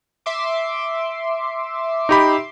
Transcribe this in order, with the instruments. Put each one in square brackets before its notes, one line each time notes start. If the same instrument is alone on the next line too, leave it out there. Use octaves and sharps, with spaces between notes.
[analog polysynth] E5 C6 D6
[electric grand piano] D#4 G4 B5